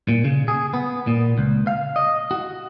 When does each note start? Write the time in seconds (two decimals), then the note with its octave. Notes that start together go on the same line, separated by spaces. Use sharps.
0.09 A#2
0.25 C#3
0.48 G#4
0.74 B3
1.07 A#2
1.38 C#2
1.67 F5
1.96 D#5
2.31 F#4